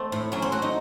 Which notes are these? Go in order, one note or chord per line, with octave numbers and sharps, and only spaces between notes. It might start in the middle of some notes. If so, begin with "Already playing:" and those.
Already playing: A3 C4
A2
F#3 C#4
C4
A3 F#4
D#4